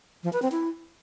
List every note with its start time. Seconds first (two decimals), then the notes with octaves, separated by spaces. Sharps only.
0.24 F3
0.33 B4
0.42 C4
0.52 E4